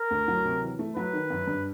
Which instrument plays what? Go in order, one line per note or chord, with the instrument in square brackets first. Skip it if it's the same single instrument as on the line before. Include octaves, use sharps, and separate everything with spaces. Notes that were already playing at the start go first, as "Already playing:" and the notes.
Already playing: [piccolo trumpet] A#4
[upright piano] D2
F#3
C3
E3
A3
[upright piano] F#3 [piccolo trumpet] B4
[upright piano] D#3
F#2
G2